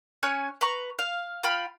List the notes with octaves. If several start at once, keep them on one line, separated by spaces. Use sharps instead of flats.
C#4 C#5 G#5 F#6
B4 A#5 C#6
F5
F4 G5 B5 F6